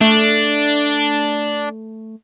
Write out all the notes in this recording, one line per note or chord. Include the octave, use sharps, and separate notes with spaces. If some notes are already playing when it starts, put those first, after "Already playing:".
A3 D4